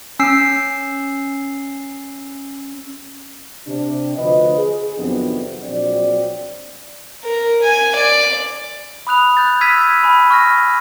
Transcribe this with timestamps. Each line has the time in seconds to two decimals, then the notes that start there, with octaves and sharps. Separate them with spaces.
0.19 C#4 E6 C7
3.68 C3 D4
4.18 D2 F3 B4 D#5
4.58 G#4
4.98 F2 C3 D#3 F#3 B3 D4
5.64 A#1 F#3 C4 D5
7.24 A#4
7.62 G#5
7.95 D5
9.07 B5 D#6 F#6 F7
9.37 F#6 G6 A6
9.61 E6 F6 G#6 B6 D#7
10.02 G#5 B5 F6
10.30 C#6 F6 A#6